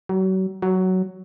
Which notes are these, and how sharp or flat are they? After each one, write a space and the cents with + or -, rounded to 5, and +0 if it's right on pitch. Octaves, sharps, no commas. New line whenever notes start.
F#3 +35
F#3 +10